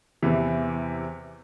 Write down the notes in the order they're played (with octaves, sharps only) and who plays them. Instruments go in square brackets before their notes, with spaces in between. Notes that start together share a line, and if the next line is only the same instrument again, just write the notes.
[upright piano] E2 C3 E3